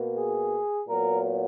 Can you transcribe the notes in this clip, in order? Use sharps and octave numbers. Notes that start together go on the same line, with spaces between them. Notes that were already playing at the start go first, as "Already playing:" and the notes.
Already playing: B2 A#3
G#4
A#2 F#3 B3 A#4